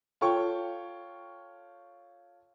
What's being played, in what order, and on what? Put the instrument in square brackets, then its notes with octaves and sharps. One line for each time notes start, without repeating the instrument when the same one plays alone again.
[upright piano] F4 A4 C#5 G5 C#6